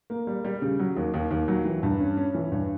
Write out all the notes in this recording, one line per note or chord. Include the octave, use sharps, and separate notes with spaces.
A#3
G3
G3
C#3
F#3
D#2
D#2
D#2
F#3
E3
G2
C#4
C#4
E3
G2